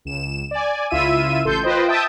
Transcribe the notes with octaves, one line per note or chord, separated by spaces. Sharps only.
C#2 E7
D5 G#5
C#2 E4 F4 E5 E6 D#7
A1 A4 C6 G6
F4 B4 C5 D#5 G5
E5 G5 A5 D#6